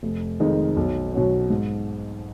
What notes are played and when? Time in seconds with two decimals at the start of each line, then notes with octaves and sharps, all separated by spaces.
0.03 F1
0.40 F2 D#3 G#3 D#4
0.77 B1
1.13 B2 F#3 C#4
1.50 G#2